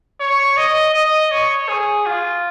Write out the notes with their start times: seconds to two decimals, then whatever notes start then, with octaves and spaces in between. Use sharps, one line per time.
0.20 C#5
0.57 D#5
0.94 D#5
1.31 C#5
1.69 G#4
2.06 F4